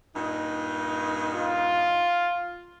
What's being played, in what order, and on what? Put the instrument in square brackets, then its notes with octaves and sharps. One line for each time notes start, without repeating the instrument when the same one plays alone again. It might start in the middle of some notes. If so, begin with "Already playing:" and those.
[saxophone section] G2 A#2 D#4
[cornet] F4